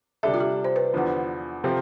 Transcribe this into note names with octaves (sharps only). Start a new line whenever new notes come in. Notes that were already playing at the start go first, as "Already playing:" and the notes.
C3 G3 D4 A4 E5
F4
G4
C5
B4
E2 D3 F3 B3
C3 F3 C4 F4 A4